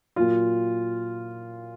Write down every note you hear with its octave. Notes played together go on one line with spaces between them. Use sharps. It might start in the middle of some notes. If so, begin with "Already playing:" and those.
A#2 F#3 F4